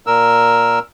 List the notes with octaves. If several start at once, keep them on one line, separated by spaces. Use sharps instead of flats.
A#2 A#4 E6